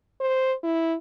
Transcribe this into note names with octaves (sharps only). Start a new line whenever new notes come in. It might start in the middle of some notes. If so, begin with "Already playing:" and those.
C5
E4